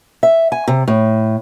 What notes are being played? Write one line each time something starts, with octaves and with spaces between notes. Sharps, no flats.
E5
G#5
C3
A2